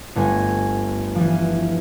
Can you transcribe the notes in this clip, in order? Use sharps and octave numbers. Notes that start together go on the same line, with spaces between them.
G1 A3 G#5
E3 F3